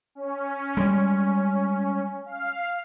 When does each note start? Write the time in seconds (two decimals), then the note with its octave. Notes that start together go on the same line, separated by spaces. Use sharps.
0.15 C#4
0.77 G3 G#3
2.26 F5